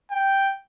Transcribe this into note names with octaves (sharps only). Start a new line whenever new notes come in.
G5